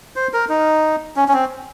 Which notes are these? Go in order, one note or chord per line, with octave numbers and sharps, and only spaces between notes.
C5
A#4
D#4
C#4
C#4
C4